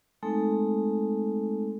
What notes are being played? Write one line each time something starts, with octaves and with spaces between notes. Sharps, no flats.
G#3 A3 C4 D#4 A4